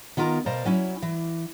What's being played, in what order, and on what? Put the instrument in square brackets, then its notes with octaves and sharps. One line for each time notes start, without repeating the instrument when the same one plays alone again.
[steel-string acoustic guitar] D#3 B3 F4 A#4 A#5
B2 A#4 C5 D5 F5 A#5
F#3 C#4 E4
E3